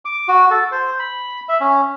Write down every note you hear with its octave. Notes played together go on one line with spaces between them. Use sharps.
D6
F#4
A4
C5
B5
E5
C#4